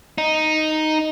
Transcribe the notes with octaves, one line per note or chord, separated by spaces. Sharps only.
D#4